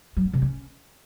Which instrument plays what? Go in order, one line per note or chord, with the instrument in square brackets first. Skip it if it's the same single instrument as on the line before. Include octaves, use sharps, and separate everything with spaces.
[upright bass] F#3
B3
C3
C#4